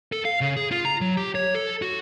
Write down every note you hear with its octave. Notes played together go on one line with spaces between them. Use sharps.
A4
F5
C#3
G#4
F4
A#5
F#3
G4
C#5
A4
F#4